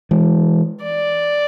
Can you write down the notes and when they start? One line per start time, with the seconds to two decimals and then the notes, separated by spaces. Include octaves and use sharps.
0.11 E3 G#3
0.83 D5